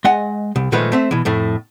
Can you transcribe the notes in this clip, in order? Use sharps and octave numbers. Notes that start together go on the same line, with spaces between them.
G#3 D#5 F#5 G#5
C2
A#2 D#3 F3 G#3 A3 B4
A3 C4 E5
B2 E3
F2 A2 A3